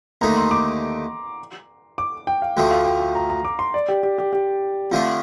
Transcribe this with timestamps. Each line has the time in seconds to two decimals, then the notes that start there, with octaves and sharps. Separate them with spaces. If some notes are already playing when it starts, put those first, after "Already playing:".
0.21 D#2 D3 A3 D#4 A#5
0.37 C6
0.51 D6
1.98 D6
2.27 G5
2.42 F5
2.57 D2 D3 F3 A3 G5
2.71 F5
2.86 G5
3.00 G5
3.15 A#5
3.30 A#5
3.45 D6
3.59 C6
3.74 D5
3.89 G4
4.03 G4
4.18 G4
4.33 G4
4.92 F2 D3 F3 A3 D4 F4